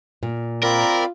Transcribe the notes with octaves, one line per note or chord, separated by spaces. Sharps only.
A#2
C4 F4 A#4 D5 B5